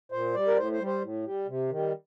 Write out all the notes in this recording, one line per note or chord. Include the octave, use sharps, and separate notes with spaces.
A#2 C5
G3 D5
A#4
A2 C5
C5
G3
C5
A2
G3
C3
D#3 G3